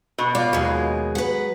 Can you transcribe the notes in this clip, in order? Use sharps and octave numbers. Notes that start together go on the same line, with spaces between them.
B2
F4 D5
D#2 F#3 G#3
B4 F#5